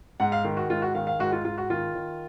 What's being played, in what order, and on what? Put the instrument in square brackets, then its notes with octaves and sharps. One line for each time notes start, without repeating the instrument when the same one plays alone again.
[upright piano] G#2 F#5
F5
D#3
F#4
G#2 F4
F#4
D#3 F5
F5
G#2 F#4
F4
G#2 F4
F#4
D#3 F4
D#3